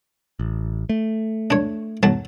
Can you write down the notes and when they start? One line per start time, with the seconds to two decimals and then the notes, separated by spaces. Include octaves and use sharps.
0.39 A1
0.89 A3
1.50 D4 C#5
2.03 B1 F#3 A5